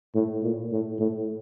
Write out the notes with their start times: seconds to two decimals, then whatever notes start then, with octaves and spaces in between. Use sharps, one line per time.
0.15 A2
0.43 A#2
0.72 A2
1.00 A2